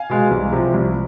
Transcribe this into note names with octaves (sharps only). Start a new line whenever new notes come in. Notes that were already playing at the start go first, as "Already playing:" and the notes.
Already playing: F5 G#5
B2 G#3
C2
C3 F3
C2